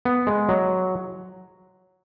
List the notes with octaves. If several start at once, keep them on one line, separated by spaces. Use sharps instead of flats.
B3
G#3
F#3